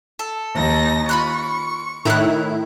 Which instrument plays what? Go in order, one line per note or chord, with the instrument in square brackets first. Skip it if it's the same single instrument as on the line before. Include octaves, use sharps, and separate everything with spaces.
[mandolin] A4
[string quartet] D#2 D#4 A#6
[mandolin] F4 B5 F#6 [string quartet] C#6
[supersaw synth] A2 D#3 E4 [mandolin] A#5 F#6